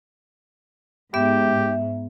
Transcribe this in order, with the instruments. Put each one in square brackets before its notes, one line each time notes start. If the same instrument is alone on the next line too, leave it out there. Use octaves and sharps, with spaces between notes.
[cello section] G#2 [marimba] B3 [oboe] G4 [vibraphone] E5